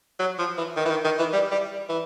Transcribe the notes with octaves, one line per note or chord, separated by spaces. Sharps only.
F#3
F3
E3
D#3
E3
D#3
D#3
E3
G3
G3
E3